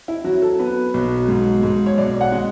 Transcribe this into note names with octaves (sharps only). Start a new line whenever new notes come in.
E4
F#3 F#4
A4
B3 B4
B1
G#2
G#2
C#5
B1 D5
F#5
G#3